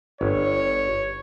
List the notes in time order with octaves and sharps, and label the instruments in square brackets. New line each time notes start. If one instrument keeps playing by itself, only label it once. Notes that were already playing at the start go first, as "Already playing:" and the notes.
[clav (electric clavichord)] G1 [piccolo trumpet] C#5